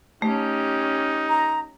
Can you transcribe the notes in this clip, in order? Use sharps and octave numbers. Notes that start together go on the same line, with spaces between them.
A3 C#4 D#4 G4
A#5